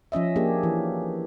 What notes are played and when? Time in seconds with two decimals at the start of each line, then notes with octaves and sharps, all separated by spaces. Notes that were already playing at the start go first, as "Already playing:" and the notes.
0.12 F3 C#4 D#5 E5
0.36 A#3 D4 G4 G#4
0.63 E3